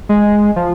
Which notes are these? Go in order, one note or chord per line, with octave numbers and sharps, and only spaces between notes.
G#3
F3